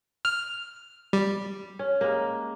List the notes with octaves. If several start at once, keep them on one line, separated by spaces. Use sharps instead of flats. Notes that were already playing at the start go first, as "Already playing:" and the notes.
F6
G3
C#4
G#3 A#3